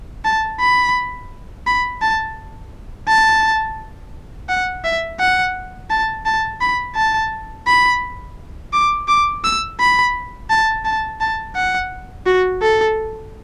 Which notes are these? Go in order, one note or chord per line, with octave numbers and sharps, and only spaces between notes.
A5
B5
B5
A5
A5
F#5
E5
F#5
A5
A5
B5
A5
B5
D6
D6
E6
B5
A5
A5
A5
F#5
F#4
A4